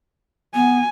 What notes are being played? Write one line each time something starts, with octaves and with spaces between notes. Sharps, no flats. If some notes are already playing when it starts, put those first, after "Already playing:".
B3 G#5